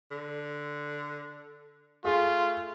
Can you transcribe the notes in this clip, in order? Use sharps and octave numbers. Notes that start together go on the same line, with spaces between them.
D3
A3 F4 G#4